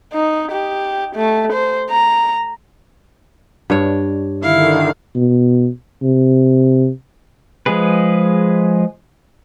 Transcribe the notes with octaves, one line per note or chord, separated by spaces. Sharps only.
D#4
G4
A3
C5
A#5
G2 D4 C#5
D3 D#3 E4 F5
B2
C3
F3 G#3 G#4 B4